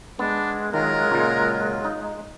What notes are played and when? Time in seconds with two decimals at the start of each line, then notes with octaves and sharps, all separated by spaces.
0.19 G#3 B3 D4
0.73 D#3 F#3 F4 A#4
1.10 C#2 A#2
1.85 D#4